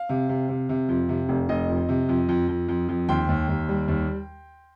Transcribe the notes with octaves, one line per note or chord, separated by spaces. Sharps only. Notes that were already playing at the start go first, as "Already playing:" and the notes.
Already playing: F5
C3
C3
C3
C3
F2
C3
F1
F1 D#5
F2
C3
F2
F2
F2
F2
F2
D#2 G5 C6
D#2
D#2
G3
D#2